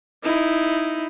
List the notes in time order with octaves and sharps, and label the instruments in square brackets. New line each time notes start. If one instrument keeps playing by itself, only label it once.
[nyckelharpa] D#4 E4